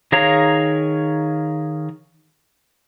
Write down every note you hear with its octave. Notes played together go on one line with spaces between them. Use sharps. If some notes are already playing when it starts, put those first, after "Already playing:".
D#3 G#4 C#5 F5 A#5